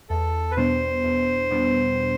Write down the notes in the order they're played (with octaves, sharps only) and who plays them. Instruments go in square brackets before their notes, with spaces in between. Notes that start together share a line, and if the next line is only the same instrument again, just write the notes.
[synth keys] E2 [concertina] A4
[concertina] B4
[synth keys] B2 G3 B3 D4 [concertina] C5
[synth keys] E2
B2 G3 B3 D4